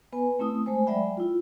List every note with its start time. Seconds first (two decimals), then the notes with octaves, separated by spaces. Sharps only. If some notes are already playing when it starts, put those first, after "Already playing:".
0.13 B3 B4 G#5
0.39 A3 C4 E4 D#6
0.66 G#3 A3 C5 G#5
0.87 F#3 G#3 D5 E5 G5 B5
1.17 E4 F4